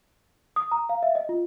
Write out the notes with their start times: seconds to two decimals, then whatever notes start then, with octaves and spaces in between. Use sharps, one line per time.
0.56 D#6
0.71 A#5
0.89 F5
1.03 E5
1.15 D#5
1.29 F4